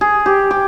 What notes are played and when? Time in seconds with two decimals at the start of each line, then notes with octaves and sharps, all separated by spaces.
0.01 G#4
0.26 G4
0.51 G4